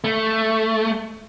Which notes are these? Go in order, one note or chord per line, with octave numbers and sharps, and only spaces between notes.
A3